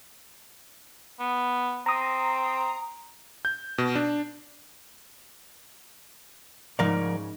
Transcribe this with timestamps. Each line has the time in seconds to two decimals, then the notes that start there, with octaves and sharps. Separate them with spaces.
1.20 B3
1.86 C4 A#5 D#6
3.45 G6
3.78 B2
3.95 D4
6.79 G#2 C#3 F3 A#4 D5 F5